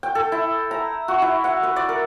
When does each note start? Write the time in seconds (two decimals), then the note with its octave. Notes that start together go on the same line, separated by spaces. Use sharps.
0.03 G5
0.15 A4
0.32 E4
0.71 A#5
1.08 F#4
1.22 E4
1.44 F#5
1.63 B4
1.76 D5
1.89 A#4